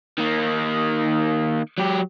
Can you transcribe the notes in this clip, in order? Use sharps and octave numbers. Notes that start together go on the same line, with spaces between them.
D#3 A#3
F#3 G4